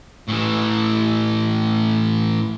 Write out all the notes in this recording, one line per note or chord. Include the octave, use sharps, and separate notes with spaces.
A2 E3